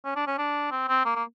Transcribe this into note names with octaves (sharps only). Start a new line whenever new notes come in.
C#4
D4
C#4
D4
C4
C4
A#3
A#3